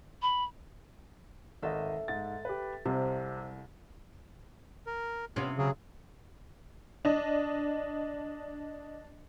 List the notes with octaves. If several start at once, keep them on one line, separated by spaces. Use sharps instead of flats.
B5
G#1 A3 A4 D#5 E5
G#2 A6
G4 B4
C2 C3 C5 D#5
A#4
C3 B3 C#4 F4
C#3 F#3 G#4
D4 D#5